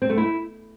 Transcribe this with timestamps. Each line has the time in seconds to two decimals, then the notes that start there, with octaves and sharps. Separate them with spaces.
0.02 C4
0.10 A3
0.17 E4